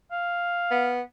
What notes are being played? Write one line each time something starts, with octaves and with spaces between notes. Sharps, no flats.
F5
B3